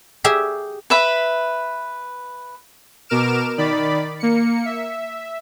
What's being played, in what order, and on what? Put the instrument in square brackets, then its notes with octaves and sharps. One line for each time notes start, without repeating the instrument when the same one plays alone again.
[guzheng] G4 G#4 E5
[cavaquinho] B4 E5 B5
[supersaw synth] B2 A#4 D6 F6 D7 E7
D#3 D5 B5
A#3 C#7
E5